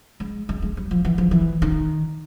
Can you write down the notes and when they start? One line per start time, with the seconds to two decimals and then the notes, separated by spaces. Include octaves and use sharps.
0.20 G#3
0.49 G#3
0.62 G#3
0.77 G3
0.91 F3
1.05 E3
1.18 F3
1.31 E3
1.62 D#3